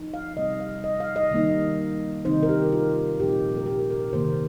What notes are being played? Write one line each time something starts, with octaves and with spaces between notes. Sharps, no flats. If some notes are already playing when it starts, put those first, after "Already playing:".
Already playing: F3 D#4
F5
C3 G3 C4 D#4 D#5
F5
D#5
F5
D#5
D#3 G3 A#3 D#4
C3 D#3 C4 D#4 C5
A#4
G4
F4
A#2 F3 C4 D#4 G4
A#4
G4
A#4
C3 D#3 A#3 C5